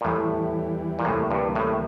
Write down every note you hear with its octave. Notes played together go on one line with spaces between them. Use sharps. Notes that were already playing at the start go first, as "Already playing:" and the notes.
A#2
E2 A2 E3 G3
A#2
D2 A2 C3 E3 G3 A#3
G2
A2